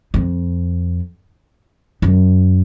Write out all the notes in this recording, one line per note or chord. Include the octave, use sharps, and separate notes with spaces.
F2
F#2